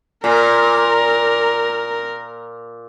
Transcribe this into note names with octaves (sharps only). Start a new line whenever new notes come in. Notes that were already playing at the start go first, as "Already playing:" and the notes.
A#2 A#4